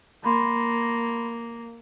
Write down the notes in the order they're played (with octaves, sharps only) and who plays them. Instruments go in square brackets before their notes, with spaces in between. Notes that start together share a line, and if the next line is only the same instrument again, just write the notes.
[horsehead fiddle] A#3 [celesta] B5 C6